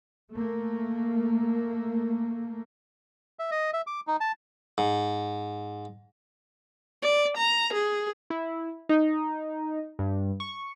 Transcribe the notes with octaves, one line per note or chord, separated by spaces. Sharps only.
A3 A#3
E5
D#5
E5
D6
D#4
A5
G#2
D5
A#5
G#4
E4
D#4
G2
C#6